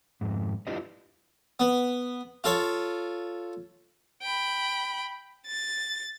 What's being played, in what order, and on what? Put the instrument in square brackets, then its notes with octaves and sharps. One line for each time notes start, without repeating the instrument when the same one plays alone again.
[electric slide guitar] F2 G#2
D4 E4 F4 G4 B4 D#5
[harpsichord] B3
F4 A4 C#5
[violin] G5 B5
A6